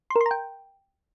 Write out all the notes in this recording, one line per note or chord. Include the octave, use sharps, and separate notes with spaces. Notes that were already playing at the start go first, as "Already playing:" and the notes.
C6
A#4
C6
A#5
G5